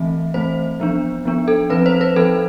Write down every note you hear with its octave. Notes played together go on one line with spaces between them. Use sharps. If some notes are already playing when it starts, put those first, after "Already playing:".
Already playing: E3 A3 C4 E5
E3 A3 C4 C5
F3 B3 D4
F3 B3 D4
A4
F3 C4 B4
C5
B4
F3 C4 A4